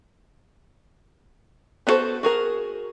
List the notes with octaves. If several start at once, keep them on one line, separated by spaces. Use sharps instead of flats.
B3 D4 F#4 A4 C5
F#4 G#4 A#4